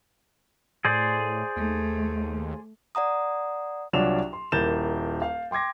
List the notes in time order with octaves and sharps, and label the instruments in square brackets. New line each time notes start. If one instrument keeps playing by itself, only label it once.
[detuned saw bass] A2 [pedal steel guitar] G#4 C5 D5
[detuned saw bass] D#2 [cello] A3
[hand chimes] D5 F#5 A#5 D#6
[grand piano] C2 F#3 D4 F4 E7 F7
C6
D#1 E4 A#4 G6 A6 E7
F5
G5 C6 D6 G#6 A#6